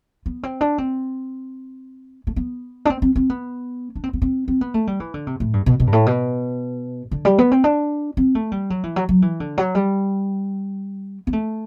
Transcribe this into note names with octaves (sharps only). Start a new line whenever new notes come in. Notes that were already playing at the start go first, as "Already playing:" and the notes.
B3
C4
D4
C4
A3
B3
D4
C4
C4
C4
B3
D4
C4
B3
C4
C4
B3
A3
G3
E3
D3
C3
A2
G2
B2
B2
G2
A2
B2
D3
G3
B3
C4
D4
C4
A3
G3
F#3
E3
F#3
F#3
E3
D3
F#3
G3
B3
A3